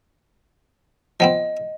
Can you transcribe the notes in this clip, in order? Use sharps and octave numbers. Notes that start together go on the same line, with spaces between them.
F3 B3 C4 D#5